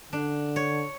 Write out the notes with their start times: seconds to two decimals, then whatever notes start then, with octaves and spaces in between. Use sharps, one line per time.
0.13 D3 D4
0.56 C#5